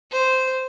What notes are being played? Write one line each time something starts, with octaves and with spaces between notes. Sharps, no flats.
C5